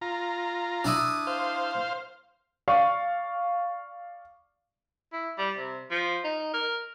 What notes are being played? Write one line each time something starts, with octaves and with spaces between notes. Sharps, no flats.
F4 A#5
D4 E4 D#6
C5 F5
D5 F5 C#6
E4
G3
C3
F3
D#4
A#4